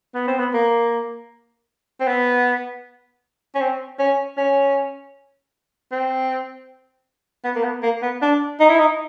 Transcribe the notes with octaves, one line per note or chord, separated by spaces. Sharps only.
B3
C4
B3
A#3
C4
B3
C#4
C4
C#4
C#4
C4
B3
A#3
B3
A#3
B3
D4
D#4
E4
D#4